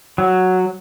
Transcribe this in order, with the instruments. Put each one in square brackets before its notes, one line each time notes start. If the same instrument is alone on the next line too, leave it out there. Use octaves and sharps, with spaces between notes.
[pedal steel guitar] F#3